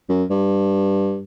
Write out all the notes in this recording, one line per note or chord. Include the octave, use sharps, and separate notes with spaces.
F#2
G2